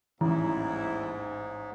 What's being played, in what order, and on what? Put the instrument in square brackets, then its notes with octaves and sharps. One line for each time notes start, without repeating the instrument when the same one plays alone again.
[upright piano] A1 [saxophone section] D#2 G3 E4 [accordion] G#2 [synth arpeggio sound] E3